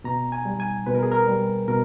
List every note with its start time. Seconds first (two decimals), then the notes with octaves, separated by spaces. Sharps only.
0.04 B2 A#5
0.32 G#5
0.45 G3
0.60 G#5
0.86 B2 B4
0.95 A#4
1.03 G#4
1.12 A#4
1.27 G3
1.68 B2 A#4